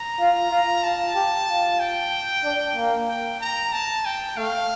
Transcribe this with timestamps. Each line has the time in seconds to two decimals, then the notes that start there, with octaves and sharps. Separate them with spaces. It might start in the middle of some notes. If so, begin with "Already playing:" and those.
Already playing: A#5
0.19 F4
0.51 F4
0.83 F4 A5
1.15 G4
1.48 F4
1.80 G5
2.44 D4
2.76 A#3
3.09 G5
3.41 A#5
3.73 A5
4.05 G5
4.37 A3 F5